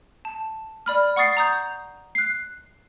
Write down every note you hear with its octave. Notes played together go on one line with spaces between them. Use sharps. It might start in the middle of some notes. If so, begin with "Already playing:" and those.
A5
D5 B5 F6
F#5 C#6 D#6 A6 C7
A#5 D#6 G6
F#6 C7